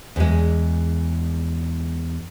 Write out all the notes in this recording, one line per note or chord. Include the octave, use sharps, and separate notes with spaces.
E2 G#3